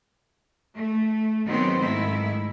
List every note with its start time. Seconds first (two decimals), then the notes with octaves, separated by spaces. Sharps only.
0.75 A3
1.46 D#3 F#3 G#3 B3 C4 C5
1.79 G#2 D#3 A3 E4